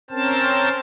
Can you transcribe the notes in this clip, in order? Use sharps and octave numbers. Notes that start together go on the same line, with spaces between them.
C4 C#4 A#4 C5 A5